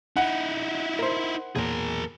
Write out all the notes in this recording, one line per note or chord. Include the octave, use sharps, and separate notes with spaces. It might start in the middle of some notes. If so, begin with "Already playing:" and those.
D#4 E4 F#5
A#4 C5
B1 E2 A#2 G#4 A#4